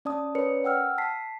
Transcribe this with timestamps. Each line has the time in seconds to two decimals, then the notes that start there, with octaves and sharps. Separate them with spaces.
0.05 C#4 D5 A5 D#6
0.35 C#4 A#4 B4 C#5 D5 C#7
0.64 F#5 G5 E6 F6
0.98 A5 B6 C7